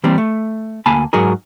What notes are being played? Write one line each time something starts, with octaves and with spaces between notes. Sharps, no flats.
E3 G3 A#3 C4
A3
D2 A#3 G#5 A5 B5
G#2 F#3 F#4 G#4 A#4